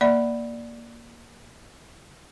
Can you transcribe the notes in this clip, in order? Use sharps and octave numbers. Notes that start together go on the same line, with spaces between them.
A#3 D5 E5 B5